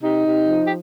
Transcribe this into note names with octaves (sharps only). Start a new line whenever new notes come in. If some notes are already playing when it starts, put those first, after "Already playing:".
C3 D#4
C3
F3
G4